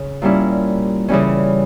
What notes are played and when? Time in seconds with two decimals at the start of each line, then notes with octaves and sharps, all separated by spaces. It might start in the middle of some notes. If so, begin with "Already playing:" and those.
Already playing: C#3
0.22 A#2 G3 C#4 E4
1.08 C#3 E3 G3 C#4